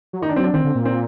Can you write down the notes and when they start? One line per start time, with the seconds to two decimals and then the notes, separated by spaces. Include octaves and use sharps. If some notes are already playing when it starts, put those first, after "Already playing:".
0.13 F#3
0.22 D#3 D#4
0.29 D4
0.36 F#3 C4
0.44 D4
0.54 D#3 C4
0.64 D3
0.75 A#2
0.85 C4